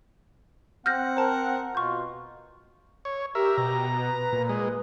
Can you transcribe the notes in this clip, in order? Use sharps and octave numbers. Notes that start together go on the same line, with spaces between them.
C4 F#5 F6 G6 A#6
A#4 C5 A5
B2 F4 C#6 G6
C#5
G4 A#4 E5
B2 A#5
B4
A#2
G#3